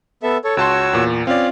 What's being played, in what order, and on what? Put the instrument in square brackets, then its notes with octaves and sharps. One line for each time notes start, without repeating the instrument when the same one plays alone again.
[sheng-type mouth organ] B3 A4 E5
A4 C#5
[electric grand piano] C#2 A5 C6 [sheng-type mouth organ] F#4 C#5 E6
[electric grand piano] E2 A#2
[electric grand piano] C4 D5 [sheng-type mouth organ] C#4 F4 F5